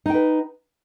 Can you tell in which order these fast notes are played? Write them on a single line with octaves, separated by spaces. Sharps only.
D#4 G5 B4